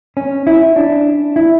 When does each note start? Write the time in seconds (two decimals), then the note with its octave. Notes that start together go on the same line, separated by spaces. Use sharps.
0.17 C#4
0.47 E4
0.76 D4
1.36 E4